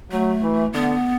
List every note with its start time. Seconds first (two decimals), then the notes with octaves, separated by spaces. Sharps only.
0.11 F#3 A3
0.43 E3
0.73 D3 B3